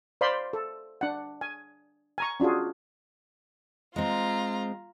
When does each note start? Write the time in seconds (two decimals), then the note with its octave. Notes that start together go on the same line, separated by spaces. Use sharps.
0.21 C5 D5 F5 B5 C6
0.53 A4
1.01 D4 F#5
1.41 G#5
2.18 G#5 A#5 C#6
2.40 C#4 D4 F4 F#4 G#4
3.96 G#3 C4 F4 A#5